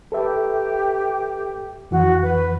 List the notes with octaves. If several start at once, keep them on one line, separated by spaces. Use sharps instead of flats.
G4 A4 B4 E5
F2 E3 F#4
B4